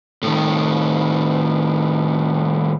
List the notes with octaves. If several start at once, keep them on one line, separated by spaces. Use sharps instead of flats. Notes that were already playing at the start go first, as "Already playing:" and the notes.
A2 D#3